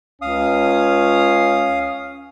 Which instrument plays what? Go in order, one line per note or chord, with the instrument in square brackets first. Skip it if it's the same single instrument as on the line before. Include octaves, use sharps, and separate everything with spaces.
[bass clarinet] C#2 [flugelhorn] C#4 [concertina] F5 D#6